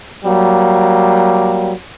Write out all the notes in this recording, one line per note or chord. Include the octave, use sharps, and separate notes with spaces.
F#3 G3 A#3